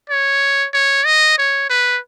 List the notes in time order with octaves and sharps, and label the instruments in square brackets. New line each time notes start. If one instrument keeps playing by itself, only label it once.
[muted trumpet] C#5
C#5
D#5
C#5
B4